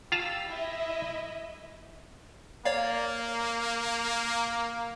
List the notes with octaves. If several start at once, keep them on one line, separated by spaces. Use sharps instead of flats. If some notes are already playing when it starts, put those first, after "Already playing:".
F4 G4 F5 A5 E6
E4 D#5 E5
A#3 C#5 D5 F5